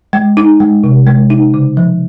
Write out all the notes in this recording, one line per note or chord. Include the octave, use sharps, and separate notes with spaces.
G#3
D#4
G#3
C3
G#3
D#4
C#3
F3